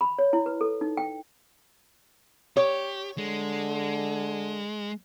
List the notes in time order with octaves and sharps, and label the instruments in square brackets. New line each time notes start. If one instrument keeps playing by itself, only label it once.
[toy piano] B5
C#5
E4
B4
A4
D#4
G5
[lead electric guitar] G4 [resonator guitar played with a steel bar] C#5
[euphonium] D3 [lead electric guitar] G#3